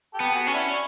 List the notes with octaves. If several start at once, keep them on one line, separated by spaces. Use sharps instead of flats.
G4 A4
B3
F#4 G#4
C#4
D4 E4